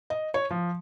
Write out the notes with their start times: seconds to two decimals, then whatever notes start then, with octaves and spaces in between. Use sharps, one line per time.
0.10 D#5
0.34 C#5
0.51 F3